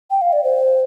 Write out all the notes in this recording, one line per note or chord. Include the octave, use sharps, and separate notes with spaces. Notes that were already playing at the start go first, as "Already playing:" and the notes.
G5
F5
D5
C5